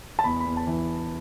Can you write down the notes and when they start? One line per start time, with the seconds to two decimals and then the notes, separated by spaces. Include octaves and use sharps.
0.19 A5
0.24 E2 B5
0.40 B5
0.46 E2
0.57 A5
0.67 E3